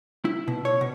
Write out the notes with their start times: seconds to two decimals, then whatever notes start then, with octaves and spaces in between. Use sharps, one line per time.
0.25 E4
0.48 B2
0.65 C#5
0.81 B2